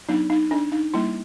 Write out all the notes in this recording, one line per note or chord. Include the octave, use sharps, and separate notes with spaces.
F#3 B3 D4 D#4
D#4
D4
D#4
G3 A#3 D4 E4